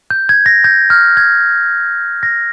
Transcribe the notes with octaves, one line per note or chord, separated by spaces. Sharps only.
G6
G#6
A#6
G6
F6
G#6
A#6